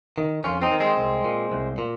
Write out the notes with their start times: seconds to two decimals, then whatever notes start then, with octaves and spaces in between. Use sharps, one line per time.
0.18 D#3
0.44 F2 C#4 F4
0.62 C4 D#4
0.71 D#3
0.80 G#3 C4
0.97 C2
1.24 A#2
1.52 C2
1.78 A#2